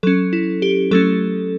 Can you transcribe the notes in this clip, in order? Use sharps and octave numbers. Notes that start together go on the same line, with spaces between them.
F#3 C#4 A4
E4
G4
F#3 A3 C#4 A4